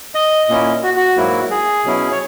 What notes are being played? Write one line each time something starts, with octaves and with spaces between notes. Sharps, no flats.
D#5
A#2 A#3 C#4 E4
F#4
F#4
G#2 F#3 A#3 E4
G#4
B2 F#3 C#4 E4
C#5